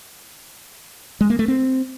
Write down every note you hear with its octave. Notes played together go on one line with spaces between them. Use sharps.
G#3
A#3
A3
C4